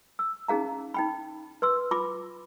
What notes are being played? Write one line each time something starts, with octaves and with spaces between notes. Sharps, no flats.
E6
C#4 D#4 G#4 F5 A#5
D#4 G5 B5
B4 C6 E6
F4 B5 D6